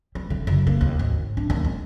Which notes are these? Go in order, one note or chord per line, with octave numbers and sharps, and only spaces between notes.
G3
D3
F#1
A#3
D#2
G#1
D4
D#2
G#3